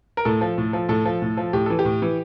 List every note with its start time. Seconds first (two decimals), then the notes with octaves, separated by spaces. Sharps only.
0.17 A#4
0.25 A2 A4
0.41 F3
0.58 A2
0.73 F3
0.89 A2 A4
1.05 F3
1.22 A2
1.37 F3
1.53 A2 G4
1.66 E3 A4
1.79 G4
1.85 A2
2.02 E3